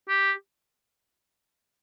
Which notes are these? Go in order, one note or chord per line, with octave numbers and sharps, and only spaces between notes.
G4